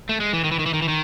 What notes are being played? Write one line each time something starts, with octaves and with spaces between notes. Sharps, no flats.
A3
G#3
E3
D#3
E3
D#3
E3
D#3
E3
D#3